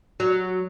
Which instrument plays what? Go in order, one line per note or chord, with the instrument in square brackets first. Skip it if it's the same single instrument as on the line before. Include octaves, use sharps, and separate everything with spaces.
[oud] F#3